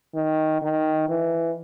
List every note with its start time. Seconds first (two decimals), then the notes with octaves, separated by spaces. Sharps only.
0.15 D#3
0.62 D#3
1.09 E3